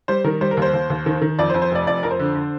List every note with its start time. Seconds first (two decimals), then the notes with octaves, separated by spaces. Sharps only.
0.08 G3 C5
0.24 D#3 A#4
0.41 G3 C5
0.51 A#4
0.57 D#2 C5
0.73 D#2
0.90 D#2
1.06 D#3
1.21 D#3
1.39 F2 D5
1.50 C5
1.54 F2
1.62 C5
1.71 F1 D5
1.87 F2 D5
2.03 F2 A#4
2.11 C5
2.20 D3
2.35 D3